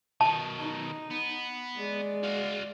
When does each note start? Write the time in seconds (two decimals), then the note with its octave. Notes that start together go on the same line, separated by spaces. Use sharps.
0.21 B2 D#3 A5
0.60 D#4
1.10 B3
1.77 G#3 D5
2.23 F#4 F5